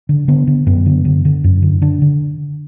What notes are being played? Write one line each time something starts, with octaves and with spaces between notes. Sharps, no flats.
D3
D3 B3
D3
F#2 B3
D3
D3
D3
F#2
D3
D3 D4
D3